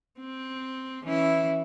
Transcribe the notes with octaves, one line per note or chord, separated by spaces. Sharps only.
C4
E3 C#4 E4